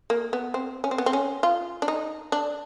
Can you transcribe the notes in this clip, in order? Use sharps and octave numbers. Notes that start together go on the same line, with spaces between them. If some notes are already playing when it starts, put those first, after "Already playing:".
A#3
B3
C4
C#4
C4
B3
C4
C#4
F4
D4
D#4
D4